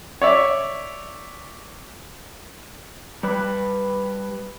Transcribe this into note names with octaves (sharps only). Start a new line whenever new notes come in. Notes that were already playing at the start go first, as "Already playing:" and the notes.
C#5 D5 E5
G3 B4